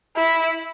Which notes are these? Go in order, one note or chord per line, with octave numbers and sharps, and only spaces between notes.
E4